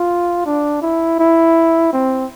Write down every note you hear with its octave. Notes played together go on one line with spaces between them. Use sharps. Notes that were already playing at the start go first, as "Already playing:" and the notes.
Already playing: F4
D4
E4
E4
C4